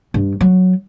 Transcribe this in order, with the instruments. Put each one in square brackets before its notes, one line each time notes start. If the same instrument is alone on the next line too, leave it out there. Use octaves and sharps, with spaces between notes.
[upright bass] G2
F#3